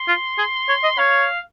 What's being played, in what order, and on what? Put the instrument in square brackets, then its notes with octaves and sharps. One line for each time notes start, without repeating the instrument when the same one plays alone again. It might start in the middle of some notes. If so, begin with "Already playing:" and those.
Already playing: [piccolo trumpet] C6
[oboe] F4
G#4
C#5
D#5
[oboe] C#5 [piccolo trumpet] F5